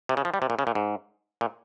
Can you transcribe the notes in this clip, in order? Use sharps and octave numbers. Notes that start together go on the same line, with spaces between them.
C3
C#3
F3
G3
C3
A#2
C#3
A#2
G#2
A#2